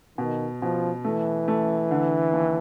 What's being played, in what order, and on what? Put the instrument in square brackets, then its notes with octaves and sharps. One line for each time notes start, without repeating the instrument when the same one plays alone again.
[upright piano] B2 [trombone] D#3
[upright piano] B2 [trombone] F3
[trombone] E3 [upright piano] A3
[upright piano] A3
D3
D#2